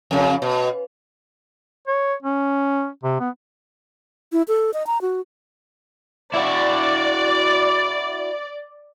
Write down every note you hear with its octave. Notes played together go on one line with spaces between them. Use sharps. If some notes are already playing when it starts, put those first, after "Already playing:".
F2 C#3
B2
C#5
C#4
C3
B3
E4
A4
D#5
A#5
F#4
E4 F#4 D5